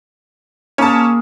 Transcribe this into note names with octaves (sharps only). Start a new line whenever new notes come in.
A#3 C#4 G#4 A5